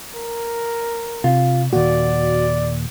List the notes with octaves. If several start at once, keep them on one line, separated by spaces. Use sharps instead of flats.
A#4
C3 F4
D#2 A#2 F#4 D5